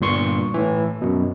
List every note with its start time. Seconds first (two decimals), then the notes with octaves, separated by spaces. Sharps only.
0.01 G1 G2 A#2 C6 C#6
0.54 A2 E3
1.02 F#2 B2